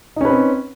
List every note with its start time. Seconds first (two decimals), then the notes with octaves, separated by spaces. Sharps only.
0.16 D#4
0.21 C#4
0.25 B4
0.29 C4